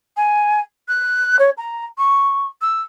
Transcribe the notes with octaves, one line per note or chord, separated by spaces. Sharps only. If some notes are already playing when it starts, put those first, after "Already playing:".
G#5
F#6
C#5
A#5
C#6
E6